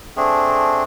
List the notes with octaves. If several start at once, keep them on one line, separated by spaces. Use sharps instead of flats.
A3 C4 D4 G#4